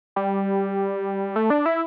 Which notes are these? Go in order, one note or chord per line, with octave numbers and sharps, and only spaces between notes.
G3
A3
D4
E4